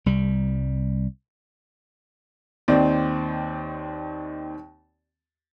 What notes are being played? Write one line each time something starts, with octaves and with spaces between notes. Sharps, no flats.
C2 G3
D#2 D#3 C4 D5